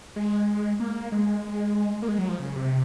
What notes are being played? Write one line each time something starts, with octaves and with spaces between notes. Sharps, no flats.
G#3
A#3
G#3
A#3
G#3
F#3
F3
C#3
C3